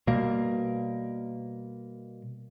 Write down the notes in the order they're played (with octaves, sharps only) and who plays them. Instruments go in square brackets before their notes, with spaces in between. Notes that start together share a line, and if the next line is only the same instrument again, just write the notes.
[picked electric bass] B2 G3 A#3